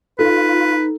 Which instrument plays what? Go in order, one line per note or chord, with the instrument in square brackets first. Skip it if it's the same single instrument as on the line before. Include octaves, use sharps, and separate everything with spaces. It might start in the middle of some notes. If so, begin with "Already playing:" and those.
[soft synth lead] D#4 [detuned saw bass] F4 [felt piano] A4 [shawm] B4